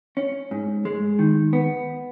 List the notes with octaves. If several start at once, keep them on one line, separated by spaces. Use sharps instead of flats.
C#4
G#2
G#3
D#3
B3